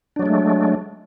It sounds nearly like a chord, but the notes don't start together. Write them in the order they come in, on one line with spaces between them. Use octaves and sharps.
D4 F#3 G#3 A3